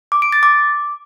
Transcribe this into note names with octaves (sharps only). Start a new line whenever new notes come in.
D6
D7
A6
D6